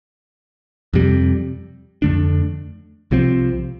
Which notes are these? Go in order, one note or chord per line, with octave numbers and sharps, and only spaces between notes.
F2 C3 G3
F2 D3 A3 D4
C2 C3 F3 C4